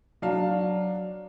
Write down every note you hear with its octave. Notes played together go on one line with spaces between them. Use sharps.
F#3 D4 F5